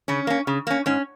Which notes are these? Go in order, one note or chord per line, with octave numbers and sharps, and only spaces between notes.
C#3 C#4
A#3 C#4
C#3
A#3 C#4
G#2 C#4